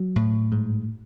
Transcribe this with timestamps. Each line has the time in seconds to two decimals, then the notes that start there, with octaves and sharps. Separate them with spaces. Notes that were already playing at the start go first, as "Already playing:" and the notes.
Already playing: F#3
0.16 A2
0.52 G#2